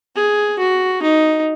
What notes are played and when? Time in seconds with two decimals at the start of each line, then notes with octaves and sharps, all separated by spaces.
0.16 G#4
0.59 F#4
1.02 D#4